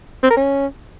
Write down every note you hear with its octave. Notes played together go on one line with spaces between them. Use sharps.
C4
A#4
C#4